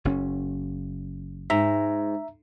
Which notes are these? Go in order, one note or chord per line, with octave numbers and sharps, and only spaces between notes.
F#1 C#4
G#2 E5 A#5